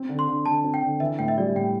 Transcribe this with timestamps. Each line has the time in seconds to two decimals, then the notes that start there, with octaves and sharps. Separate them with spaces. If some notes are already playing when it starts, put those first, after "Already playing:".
Already playing: C4
0.09 D3
0.19 C6
0.28 D3
0.46 D3 A5
0.64 C4
0.74 G5
0.83 D3
1.00 E3 E5
1.19 A2 G5
1.28 E5
1.38 G3 D5
1.56 A2 G5